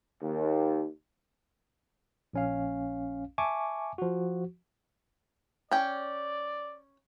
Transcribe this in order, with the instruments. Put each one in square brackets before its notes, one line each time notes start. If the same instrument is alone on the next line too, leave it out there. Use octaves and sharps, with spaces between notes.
[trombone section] D#2
[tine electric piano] A#1 C#4 F5
E5 G#5 A5 C#6 D6
F3 F#4
[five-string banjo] C#4 G5 [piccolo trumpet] D5